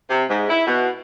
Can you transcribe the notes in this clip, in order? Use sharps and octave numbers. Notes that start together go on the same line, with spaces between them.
C3
G#2
E4
B2